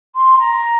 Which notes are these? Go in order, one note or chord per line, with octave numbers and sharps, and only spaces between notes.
C6
A#5